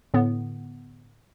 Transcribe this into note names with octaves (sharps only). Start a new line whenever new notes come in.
A2 D3 B3